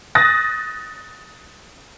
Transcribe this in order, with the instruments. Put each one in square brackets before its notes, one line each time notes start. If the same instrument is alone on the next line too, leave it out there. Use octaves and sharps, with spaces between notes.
[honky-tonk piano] D#6 F#6 A6 A#6